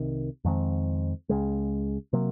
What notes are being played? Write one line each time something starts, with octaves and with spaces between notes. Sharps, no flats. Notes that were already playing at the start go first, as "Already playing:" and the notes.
Already playing: C2 C3 D#3
F2 D#3 G#3 C4
C#2 C#3 G#3
C3 F#3 A#3